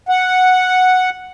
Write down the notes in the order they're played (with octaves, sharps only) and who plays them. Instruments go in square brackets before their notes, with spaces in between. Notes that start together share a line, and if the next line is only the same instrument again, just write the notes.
[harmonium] F#5